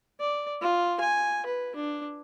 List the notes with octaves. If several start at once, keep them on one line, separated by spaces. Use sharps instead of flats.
D5
F4
G#5
B4
D4